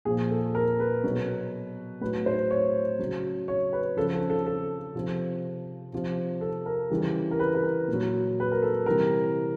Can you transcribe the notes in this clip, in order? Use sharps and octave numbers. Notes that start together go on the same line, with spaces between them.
A#2 F3 G#4
A4
A#4
B4
B2 F#3
A2 F#3 B4
C5
C#5
C#3 F#3
C#5
B4
C#3 F3 A4
A4
A4
A4
C3 F3
C3 F3
A4
A#4
C#3 E3 G3
A#4
B4
B4
A#4
A#2
F#3
B4
A#4
A4
C3 E3 G3 A#4